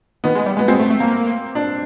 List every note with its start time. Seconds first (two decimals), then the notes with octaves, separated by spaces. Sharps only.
0.24 D#3 B3
0.35 G#3
0.46 G3
0.57 G#3 B3
0.68 G#3 C4
0.80 A3
0.90 A3
1.00 A#3
1.55 D4